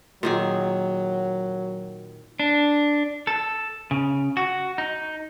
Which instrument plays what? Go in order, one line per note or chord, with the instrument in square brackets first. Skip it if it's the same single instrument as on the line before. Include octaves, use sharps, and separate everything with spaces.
[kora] A#2 D#3 G#4 [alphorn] F#3
[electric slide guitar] D4
[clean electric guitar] A4
C#3
F#4
D#4